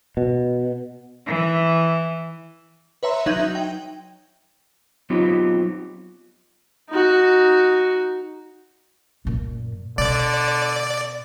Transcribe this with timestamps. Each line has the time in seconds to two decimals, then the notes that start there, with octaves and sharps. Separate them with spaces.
0.17 B2
1.27 E3
3.03 B4 C#5 E5 A#5 C6
3.26 F#3 D#4 E5 G6 G#6 F#7
3.40 D#4
3.55 G5
5.10 F#3 B3 C4 D#4 F4 G4
6.89 D#4 F#4
9.25 F#2 A#2
9.98 B2 D3 D5